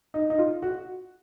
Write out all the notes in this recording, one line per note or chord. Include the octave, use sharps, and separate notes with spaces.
D#4
D#4
F4
F#4